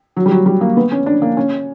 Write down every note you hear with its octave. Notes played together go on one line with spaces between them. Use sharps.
F#3
G3
F#3
G3
A#3
B3
C#4
D4
A#3
C#4